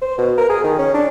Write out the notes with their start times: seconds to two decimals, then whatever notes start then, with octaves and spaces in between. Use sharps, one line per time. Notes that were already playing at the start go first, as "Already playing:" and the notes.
0.02 C5
0.18 B2
0.37 A#4
0.49 G#4
0.64 D#3
0.78 C#4
0.94 D4